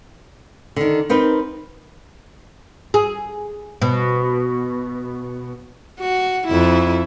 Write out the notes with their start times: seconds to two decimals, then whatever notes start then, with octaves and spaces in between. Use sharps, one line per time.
0.76 D3 D#3
1.09 C4 D#4 A#4 B4
2.94 G#4
3.82 B2
6.00 F#4
6.48 F2 E4